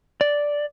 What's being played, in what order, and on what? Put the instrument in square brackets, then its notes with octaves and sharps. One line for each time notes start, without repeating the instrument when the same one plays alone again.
[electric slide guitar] D5